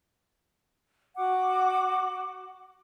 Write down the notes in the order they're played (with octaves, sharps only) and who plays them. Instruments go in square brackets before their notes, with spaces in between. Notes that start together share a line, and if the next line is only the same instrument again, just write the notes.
[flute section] F#4 F#5 D6